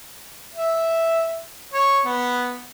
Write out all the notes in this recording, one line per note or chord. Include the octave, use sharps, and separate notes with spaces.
E5
C#5
B3